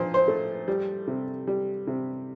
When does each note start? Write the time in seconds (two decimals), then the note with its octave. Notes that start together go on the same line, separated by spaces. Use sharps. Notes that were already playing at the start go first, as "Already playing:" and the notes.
Already playing: A#2 F3 C5
0.14 C5
0.28 A3
0.68 G3
1.07 C3
1.47 G3
1.87 C3